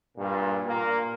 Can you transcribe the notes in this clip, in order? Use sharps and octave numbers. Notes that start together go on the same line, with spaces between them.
G2 A#2
A#2 A#3